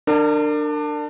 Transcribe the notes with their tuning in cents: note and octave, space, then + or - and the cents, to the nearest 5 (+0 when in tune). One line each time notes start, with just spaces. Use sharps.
D4 +20 A#4 -30